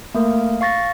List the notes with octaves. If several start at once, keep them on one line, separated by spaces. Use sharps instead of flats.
A3 A#3 A#4
F5 C#6 A6 A#6